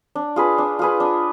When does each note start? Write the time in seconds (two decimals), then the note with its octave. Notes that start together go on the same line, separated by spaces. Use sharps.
0.15 D4
0.36 F4 G#4 B4
0.58 D4
0.79 F4 G#4 B4
1.00 D4